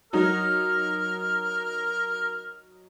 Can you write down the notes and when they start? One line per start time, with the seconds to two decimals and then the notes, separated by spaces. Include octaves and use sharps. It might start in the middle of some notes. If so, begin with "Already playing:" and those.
0.13 F#3 D#4 A#4 F6